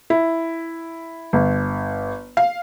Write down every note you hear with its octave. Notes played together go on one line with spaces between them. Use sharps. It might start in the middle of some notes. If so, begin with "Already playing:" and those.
E4
G1
F5